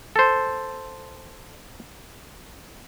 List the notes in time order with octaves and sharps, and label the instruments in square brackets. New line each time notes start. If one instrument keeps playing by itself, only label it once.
[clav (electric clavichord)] A4 C5